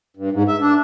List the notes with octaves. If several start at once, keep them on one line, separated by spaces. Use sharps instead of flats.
G2
G#2
E5
D4